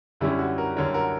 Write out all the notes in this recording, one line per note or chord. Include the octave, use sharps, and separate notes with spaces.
F#2 D3 G3 C#4 E4
F#4
F#4 A#4
F#2 D3 G3 C#4 A#4 C#5
F#4 A#4